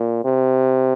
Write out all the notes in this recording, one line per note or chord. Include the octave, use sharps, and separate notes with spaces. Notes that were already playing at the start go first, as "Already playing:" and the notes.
Already playing: A#2
C3